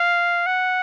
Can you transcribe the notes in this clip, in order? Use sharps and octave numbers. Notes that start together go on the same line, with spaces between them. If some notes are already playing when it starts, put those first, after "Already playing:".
Already playing: F5
F#5